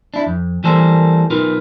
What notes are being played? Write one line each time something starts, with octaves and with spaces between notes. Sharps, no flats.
D4 E4
F2
E3 G3 A#3 A4 A#4 C5
B1 D#4 F4 A#4 B4